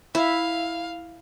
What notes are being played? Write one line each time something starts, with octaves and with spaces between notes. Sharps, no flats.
E4 F5